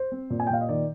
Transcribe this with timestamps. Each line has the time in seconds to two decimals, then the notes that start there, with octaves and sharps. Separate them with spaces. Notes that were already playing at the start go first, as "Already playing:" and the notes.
Already playing: C5
0.12 C4
0.30 A#2
0.40 G#5
0.47 G5
0.50 A#2 F5
0.61 D#5
0.69 D#3 D5